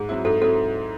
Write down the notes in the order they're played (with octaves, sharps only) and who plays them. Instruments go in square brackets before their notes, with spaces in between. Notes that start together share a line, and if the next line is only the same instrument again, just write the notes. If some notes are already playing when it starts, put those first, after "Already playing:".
Already playing: [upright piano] G#2 [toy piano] G#4
[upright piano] F#3 C4 E4
[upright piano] G#2 [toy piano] A4
[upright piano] F#3 C4 E4 [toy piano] A4